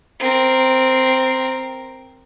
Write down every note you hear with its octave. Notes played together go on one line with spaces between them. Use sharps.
C4 A#4